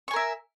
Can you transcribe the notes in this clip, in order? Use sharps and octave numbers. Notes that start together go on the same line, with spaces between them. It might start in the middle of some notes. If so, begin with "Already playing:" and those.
A#4 E5 G#5 C#6